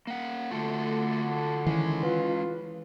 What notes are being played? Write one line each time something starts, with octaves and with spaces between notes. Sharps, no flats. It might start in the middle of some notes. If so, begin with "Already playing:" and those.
A#3 F#5
D3 A3 F4 F#4 A4
D#3 E3 G#3 C#4
F4 B4